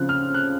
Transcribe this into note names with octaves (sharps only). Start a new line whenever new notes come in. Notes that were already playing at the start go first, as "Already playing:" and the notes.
Already playing: C#3 F3 C4 F#6
F6
F#6